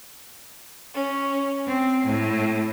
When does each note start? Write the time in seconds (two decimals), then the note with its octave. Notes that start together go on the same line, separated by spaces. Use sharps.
0.95 C#4
1.67 C4
2.05 A2